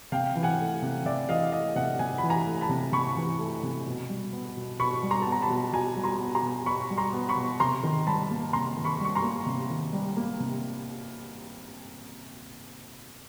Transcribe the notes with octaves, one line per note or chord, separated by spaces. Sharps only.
C3 F5 G5
E3
F#5 G#5
A3
C3
C3 D5 E5
E3 D#5 F5
A3 D#5 F5
C3 E5 F#5
C3 F#5 G#5
B5
E3
G#5 A#5
A3
A5 B5
C3
C3 B5 C#6
E3
A3
C3
B2
G3
B3
B2
B2 B5 C#6
G3
A#5 C6
B3 A5
A#5
A5 B5
B2
B2 G#5 A#5
G3
A#5 C6
B3
A#5 C6
B2
B2 B5 C#6
G3
A#5 C6
B3
B5 C#6
B2
C3 A#5 C6
D#3
G3 A5 B5
A#3
C3 A#5 C6
D#3
B5 C#6
G3 C#6
A#5 C6
A#3
C3
D#3
G3
A#3
C3